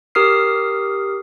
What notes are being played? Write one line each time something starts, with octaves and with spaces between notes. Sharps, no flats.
G4 A#4 D#6 F6 C7